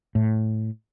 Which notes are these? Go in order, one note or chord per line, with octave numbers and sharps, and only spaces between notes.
A2